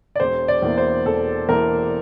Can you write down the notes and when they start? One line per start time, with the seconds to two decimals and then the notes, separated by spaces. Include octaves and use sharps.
0.16 D5
0.20 E1 C5
0.48 D5
0.62 E2 E3 A#3 E4
0.78 C5
1.06 E1 A4
1.49 E2 E3 A#3 E4 A#4